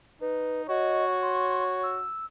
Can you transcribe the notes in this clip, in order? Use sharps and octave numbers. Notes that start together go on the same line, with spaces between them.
D#4 B4
F#4 C#5 D#5
C6
E6